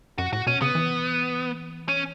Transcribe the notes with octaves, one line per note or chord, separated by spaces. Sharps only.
F#2 F#4
A2 F#4
B2 C#4
C#3 B3
E3
C#4